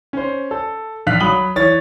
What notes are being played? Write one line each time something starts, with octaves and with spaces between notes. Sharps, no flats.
C#4 C5
A4
A#1 F5 F#6 B6
F#3 B5 D#6 F#7 G7
E3 C#5 A6